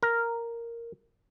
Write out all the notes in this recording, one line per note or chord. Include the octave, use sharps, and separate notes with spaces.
A#4